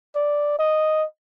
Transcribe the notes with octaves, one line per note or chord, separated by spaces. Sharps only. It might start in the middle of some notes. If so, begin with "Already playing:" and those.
D5
D#5